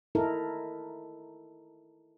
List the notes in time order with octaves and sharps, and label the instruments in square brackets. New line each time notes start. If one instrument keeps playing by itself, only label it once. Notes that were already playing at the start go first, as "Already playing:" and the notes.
[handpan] D#4 E4 A4 A#4